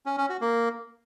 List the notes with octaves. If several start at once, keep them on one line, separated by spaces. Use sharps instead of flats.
C#4
C#4
F#4
A#3